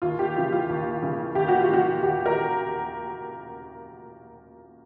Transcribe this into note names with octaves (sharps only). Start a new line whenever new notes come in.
D#2 F4
G4
C#3 E3 F4
F4
D#2
C#3 E3
D#2 G4
F#4
F4
C#3 E3 F#4
D#2 G4
A#4